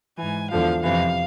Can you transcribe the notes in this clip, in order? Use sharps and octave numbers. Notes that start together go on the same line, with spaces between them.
G#2 E3 G#5
E2 D3 F3 F5
F2 C3 E3 F5